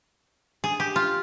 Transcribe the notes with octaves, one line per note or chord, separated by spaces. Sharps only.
G#4
G4
F4